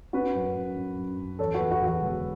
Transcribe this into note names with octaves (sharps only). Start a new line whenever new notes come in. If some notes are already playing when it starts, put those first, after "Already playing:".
C#4 F#4 B4
F#2
F#2
F#2
F#2
F#2
E2 A4 C#5
F#4 B4
E2
F#4 B4
E2
F#4
E1